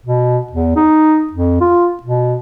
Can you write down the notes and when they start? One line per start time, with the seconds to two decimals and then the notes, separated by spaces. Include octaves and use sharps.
0.06 B2
0.52 E2
0.77 D#4
1.33 F2
1.61 F4
2.03 B2